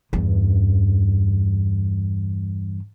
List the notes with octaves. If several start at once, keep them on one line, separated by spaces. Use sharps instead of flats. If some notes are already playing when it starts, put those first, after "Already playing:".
E2 G2